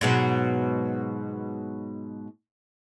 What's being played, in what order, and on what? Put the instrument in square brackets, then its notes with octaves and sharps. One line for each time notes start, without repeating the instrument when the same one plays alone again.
[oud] G#2 B2 F#3